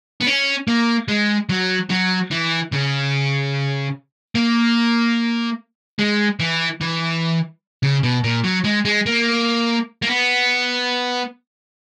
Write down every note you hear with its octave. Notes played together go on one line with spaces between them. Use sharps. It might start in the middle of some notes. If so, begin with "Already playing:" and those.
B3
C#4
A#3
G#3
F#3
F#3
E3
C#3
A#3
G#3
E3
E3
C#3
B2
A#2
F#3
G#3
G#3
A#3
A#3
B3